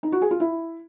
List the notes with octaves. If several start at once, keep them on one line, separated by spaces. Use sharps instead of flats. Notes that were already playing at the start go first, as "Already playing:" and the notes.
D#4
F#4
G#4
F4
E4